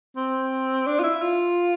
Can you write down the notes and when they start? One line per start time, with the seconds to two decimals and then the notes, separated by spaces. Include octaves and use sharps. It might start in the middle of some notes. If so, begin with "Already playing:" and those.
0.17 C4
0.87 D4
1.00 F4
1.03 E4
1.22 F4